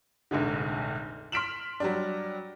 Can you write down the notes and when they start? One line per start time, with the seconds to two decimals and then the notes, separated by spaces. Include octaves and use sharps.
0.31 F1 A#1 G#2 D3
1.32 C6 F6 B6 D7 E7 F#7
1.80 F#3 G3 D4